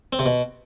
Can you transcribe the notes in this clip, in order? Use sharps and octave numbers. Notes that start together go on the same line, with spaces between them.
C4
C3
B2